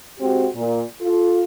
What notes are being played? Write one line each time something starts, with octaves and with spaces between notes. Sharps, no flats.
G#3 C4 F#4 G4
A#2
F4 A4